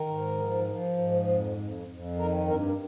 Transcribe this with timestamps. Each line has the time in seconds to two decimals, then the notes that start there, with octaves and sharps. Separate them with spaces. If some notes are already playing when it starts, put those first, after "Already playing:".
Already playing: D#3 A#4
0.09 G#2
0.38 F3
0.68 F3
0.98 G#2
1.28 F2
1.58 F2
1.88 F2
2.17 D#3 A#4
2.47 G2 A#4